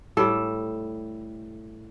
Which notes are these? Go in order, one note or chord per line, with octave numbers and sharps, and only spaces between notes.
A2 G3 A4